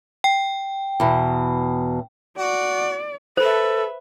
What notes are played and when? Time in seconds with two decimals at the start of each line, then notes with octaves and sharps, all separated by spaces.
0.24 G5
1.00 E2 B2
2.38 F#4 D5
3.37 A4 B4 C5 E5